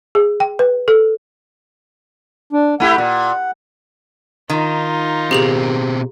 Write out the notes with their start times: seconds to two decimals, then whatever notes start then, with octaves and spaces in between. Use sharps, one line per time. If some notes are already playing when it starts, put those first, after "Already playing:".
0.15 G#4
0.40 G5
0.59 B4
0.88 A4
2.53 D4
2.80 A3 E4 G4 F#5
2.98 A#2
4.50 D#3 D#4 F4
5.31 B2 C4 G4 G#4 F7